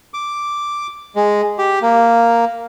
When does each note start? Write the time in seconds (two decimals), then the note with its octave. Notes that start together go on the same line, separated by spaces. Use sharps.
0.14 D6
1.16 G#3
1.59 G4
1.82 A#3